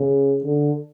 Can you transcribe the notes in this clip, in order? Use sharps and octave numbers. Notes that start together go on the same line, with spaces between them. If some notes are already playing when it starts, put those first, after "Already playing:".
Already playing: C#3
D3